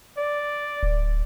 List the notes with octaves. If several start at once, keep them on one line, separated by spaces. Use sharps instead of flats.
D5
D1